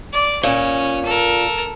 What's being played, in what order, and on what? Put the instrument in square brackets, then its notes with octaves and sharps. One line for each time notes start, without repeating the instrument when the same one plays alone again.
[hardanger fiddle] D5
[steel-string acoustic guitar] A#2 [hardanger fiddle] C#4
[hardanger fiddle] A4 A#4